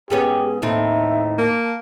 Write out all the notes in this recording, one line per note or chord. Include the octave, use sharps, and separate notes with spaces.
G#2 B3 C#4 G4 G#4
D#2 A2 C4 D#4 E5
A#3 A5